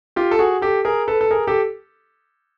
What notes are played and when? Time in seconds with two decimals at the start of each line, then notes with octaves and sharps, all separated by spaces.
0.16 F4 G4
0.31 A4
0.39 F#4 G#4
0.62 G4 A4
0.85 G#4 A#4
1.08 A4 B4
1.21 A4
1.31 G#4 A#4
1.47 G4 A4